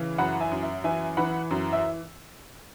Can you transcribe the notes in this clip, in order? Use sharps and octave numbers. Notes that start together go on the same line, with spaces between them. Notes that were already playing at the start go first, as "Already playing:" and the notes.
Already playing: C#3 E3
F#2 F#5 B5
E5 G#5
F#2
E5
E3 E5 G#5
E3 F#5 B5
F#2
E5